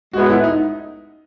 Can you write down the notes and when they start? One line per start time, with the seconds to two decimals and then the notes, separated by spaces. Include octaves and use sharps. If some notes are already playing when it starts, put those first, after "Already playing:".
0.13 A2 G#3 B3 F#4
0.29 E4
0.44 D#4